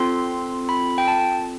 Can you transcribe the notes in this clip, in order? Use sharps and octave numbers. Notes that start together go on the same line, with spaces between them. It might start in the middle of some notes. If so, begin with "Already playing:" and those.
Already playing: C4 F4 A4 C6
B5
G5
A5